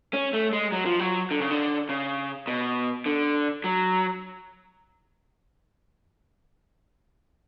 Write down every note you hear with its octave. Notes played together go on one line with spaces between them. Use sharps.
C#4
A3
G#3
F#3
F3
F#3
D3
C#3
D3
C#3
B2
D3
F#3